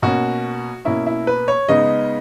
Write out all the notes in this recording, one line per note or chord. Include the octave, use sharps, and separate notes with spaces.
B2 A#3 C#4 F#4
B2 A#3 C#4 E4
E4
B4
C#5
C#3 G#3 B3 D#4 D#5